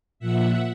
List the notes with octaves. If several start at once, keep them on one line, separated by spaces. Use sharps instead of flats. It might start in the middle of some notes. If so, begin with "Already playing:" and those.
A#2 F3 E5 F#5